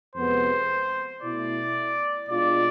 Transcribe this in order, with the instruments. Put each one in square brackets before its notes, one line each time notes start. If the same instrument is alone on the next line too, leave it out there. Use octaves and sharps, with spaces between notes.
[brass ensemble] F2 C3 G#3 B3 [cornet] C5
[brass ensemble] B2 A3 E4 [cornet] D5
[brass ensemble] B2 G#3 D4 F4 [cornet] D5